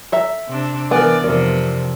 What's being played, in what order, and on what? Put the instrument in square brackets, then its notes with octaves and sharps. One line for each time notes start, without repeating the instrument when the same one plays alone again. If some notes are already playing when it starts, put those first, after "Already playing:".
[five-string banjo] A4 E5 A#5
[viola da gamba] C3 C4 D4
[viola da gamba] E3 D5 [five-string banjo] B3 [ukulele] A#4 G#5
[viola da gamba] F2 C3 [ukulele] A#4 D5